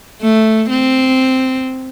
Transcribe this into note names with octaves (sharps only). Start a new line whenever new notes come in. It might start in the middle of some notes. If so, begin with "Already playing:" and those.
A3
C4